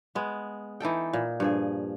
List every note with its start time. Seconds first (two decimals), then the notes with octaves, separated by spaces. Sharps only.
0.15 G#3 B3
0.80 E3 D#4 A4 G5
1.13 A#2
1.40 G2 F3 G#4